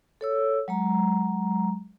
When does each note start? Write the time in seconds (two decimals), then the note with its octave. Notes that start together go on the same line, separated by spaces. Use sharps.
0.21 A4 C#5 E6
0.68 F#3 G#3 A#5